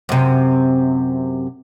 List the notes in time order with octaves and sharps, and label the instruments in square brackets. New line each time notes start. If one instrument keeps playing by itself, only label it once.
[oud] F#2 C3